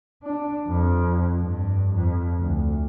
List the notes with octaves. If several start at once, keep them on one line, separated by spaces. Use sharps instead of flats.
D4
F2
G2
F2
D2